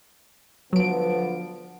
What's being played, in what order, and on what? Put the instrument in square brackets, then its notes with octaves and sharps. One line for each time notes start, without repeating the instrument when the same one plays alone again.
[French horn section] D3 F3 B3 [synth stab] F#3 D7